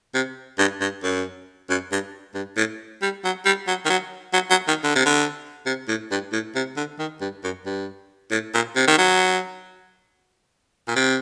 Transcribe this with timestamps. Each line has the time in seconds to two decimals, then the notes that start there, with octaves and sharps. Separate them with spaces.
0.14 C3
0.59 G2
0.81 G2
1.03 F#2
1.70 F#2
1.92 G2
2.35 G2
2.57 A2
3.02 G3
3.24 F#3
3.45 G3
3.67 F#3
3.85 D#3
3.90 F#3
4.33 F#3
4.50 F#3
4.68 D#3
4.83 D3
4.95 C3
5.06 D3
5.66 C3
5.88 A2
6.11 G2
6.32 A2
6.55 C3
6.76 D3
6.99 D#3
7.21 G2
7.43 F#2
7.66 G2
8.31 A2
8.54 A#2
8.76 C3
8.87 D#3
8.98 F#3
10.88 A#2
10.96 C3